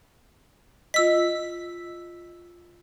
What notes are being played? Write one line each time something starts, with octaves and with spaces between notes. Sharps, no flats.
F4 D#5 E6 B6